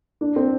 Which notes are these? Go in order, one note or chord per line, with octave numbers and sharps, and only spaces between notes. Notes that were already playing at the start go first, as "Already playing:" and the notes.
D4
C4